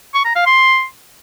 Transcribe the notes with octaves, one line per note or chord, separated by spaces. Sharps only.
C#6
A#5
F5
C6